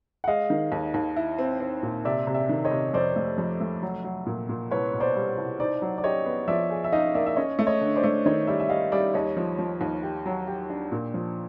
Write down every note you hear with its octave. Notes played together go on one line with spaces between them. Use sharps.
F#5
G#3 D#5 F5
D#3
D#2
D#2
E4
C4
C4
A#2
C3 D5 E5
C3
D5 E5
D#3
C#5 D#5
C3
F2 C5 D5
A3
F2
A3
F#3
F#3
A#2
A#2
C2 B4 C#5
B2
C5 D5
G3
C2
D#4 C5 D5
F#3
D5
G4 C#5 D#5
B3
F3 D5 E5
G#4
E5
D#4 D#5 F5
A#3 D5 E5
E5
C#4 C#5 D#5
A3
C#5 D#5
D3
C5 D5
A3
D#3 C#5 D#5
G3 D5 E5
E5
G3 D#5 F5
G3 D5 E5
D#2 C#5 D#5
F3
F3
D#2
G4
F#3
G4
D4
A#2
F3